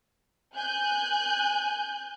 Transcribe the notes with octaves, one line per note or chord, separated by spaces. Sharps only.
G#5 F#6 G6